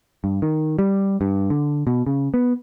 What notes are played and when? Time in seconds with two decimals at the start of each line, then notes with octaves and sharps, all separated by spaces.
0.24 G2
0.42 D#3
0.79 G3
1.21 G2
1.50 D3
1.87 B2
2.07 C#3
2.34 B3